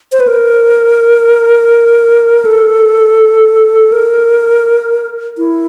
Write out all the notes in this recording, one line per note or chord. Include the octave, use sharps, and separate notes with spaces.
C5
B4
A#4
A4
A#4
E4